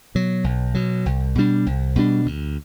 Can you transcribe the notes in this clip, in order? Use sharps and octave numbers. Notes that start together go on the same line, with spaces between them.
B2 F#3
B1
B2 F#3
C2
B2 G3 D4
C2
B2 G3 D4
D2